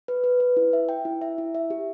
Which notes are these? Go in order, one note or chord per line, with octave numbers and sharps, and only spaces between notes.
B4
B4
B4
E4
E5
G5
E4
E5
E4
E5
G4